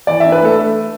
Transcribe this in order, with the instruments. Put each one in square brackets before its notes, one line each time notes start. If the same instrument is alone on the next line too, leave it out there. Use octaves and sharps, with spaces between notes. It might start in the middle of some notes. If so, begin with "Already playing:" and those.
[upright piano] E3 D5
D4 E5
B4
A3 A4